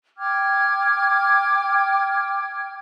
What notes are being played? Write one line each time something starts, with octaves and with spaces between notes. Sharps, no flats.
G5 D6 F6 G#6